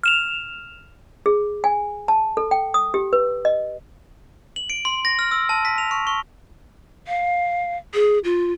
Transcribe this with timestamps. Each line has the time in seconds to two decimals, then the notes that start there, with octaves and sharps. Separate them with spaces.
0.03 F6 E7 F7
1.26 G#4
1.64 G#5
2.08 A5
2.37 A4
2.51 G5
2.74 D#6
2.94 G4
3.13 B4
3.45 D#5
4.56 F#7
4.70 D7
4.85 C6
5.05 A#6
5.19 F6
5.31 E6
5.49 A5
5.65 B6
5.78 F7
5.91 C#6
6.07 C#6
7.07 F5
7.94 G#4
8.24 F4